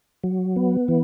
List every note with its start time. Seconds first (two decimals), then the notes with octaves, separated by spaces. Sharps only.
0.24 F#3
0.56 B3
0.88 E3